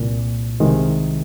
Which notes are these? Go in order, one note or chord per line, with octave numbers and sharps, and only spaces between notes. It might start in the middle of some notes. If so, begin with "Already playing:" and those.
Already playing: C2 A#2
C2 C3 D#3 G#3